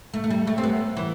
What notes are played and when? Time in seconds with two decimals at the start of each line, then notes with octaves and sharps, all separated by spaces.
0.14 A3
0.24 A3
0.30 G3
0.47 A3
0.58 C4
0.64 B3
0.97 E3